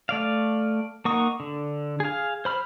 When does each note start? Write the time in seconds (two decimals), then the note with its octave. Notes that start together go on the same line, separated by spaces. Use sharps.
0.09 A3 D5 F5
1.05 A#3 D#4 F#5 C#6 D#6
1.40 D3
2.00 G#4 F5
2.45 C5 B5 F6